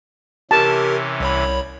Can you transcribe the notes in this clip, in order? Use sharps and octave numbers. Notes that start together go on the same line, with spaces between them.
C3 E3 C#4 G4 A#4 A5
C2 C#5 B5